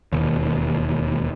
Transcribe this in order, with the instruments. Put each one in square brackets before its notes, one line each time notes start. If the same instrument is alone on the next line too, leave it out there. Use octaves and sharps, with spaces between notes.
[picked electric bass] E1 D#2